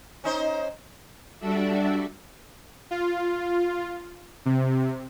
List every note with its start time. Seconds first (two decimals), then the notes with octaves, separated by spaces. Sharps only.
0.24 C#4 D#4 C5
1.39 G3 D4 F#4 A4 D5 E5
2.91 F4
4.46 C3